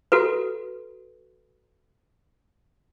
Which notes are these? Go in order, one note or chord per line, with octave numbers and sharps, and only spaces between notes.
F#4 A4 B4